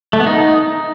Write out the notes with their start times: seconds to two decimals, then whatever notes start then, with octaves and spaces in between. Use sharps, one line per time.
0.13 A3
0.20 B3
0.27 D#4